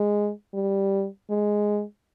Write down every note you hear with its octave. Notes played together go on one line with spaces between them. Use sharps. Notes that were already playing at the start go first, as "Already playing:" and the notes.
Already playing: G#3
G3
G#3